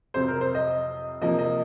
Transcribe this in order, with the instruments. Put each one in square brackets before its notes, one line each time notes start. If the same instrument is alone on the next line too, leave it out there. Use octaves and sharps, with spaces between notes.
[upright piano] F2 C3 F#3 C5
A#4
C5
D#5
C3 F3 A#3 D#5
D#5